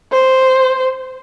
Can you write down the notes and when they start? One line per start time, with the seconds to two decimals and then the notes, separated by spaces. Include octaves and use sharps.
0.11 C5